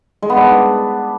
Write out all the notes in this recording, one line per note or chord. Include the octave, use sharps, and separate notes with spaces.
G#3
B3
D4